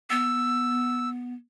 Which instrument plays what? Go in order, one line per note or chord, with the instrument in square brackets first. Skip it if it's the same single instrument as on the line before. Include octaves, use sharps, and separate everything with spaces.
[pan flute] B3 [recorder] E6